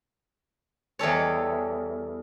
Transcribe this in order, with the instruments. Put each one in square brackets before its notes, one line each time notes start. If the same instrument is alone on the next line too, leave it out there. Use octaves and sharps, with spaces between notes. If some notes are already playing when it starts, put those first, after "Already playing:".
[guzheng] E2 G3 A4 C#5